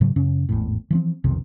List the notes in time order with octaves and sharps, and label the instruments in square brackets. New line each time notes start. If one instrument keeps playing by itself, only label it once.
[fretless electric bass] G#2 C#3 F#3
F#2 C#3 C#4
G#1 E2 A2
E3 F3 C4
B1 F2 C3 D#3